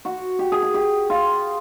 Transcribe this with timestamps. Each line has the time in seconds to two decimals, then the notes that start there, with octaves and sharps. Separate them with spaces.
0.05 F#4
0.39 G4
0.52 G#4
0.62 G#4
0.74 G4
1.10 F4